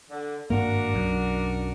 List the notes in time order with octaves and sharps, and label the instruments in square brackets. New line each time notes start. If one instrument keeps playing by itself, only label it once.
[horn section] D3
[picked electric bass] G#1 G2 A#3 [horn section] D4 F#4 A#4
[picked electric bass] B1 F#2